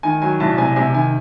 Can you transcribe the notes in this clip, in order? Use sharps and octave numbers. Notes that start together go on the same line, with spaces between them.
D#3 G#5
F#3 G#5
C2 A5
C3 G#5
C3 G#5
D#3 G#5